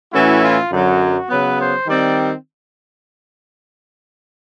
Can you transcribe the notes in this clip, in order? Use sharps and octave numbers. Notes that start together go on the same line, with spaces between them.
A2 E3 A3 C#4 E4 F#4
F4
F#2 D3 F#3 F#4
C#3 F#3 B3 B4
C5
D#3 G3 C4 D5